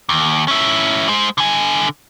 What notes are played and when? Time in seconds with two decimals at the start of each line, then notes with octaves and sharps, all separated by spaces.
0.09 D#2
0.48 C#4 E4
1.09 G#3 C5
1.38 D3 G#5